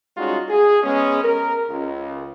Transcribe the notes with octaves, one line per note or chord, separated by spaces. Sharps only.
G3 G#3 C#4 D#4 F4 F#4
G#4
G#3 B3 C#4
A#4
C#2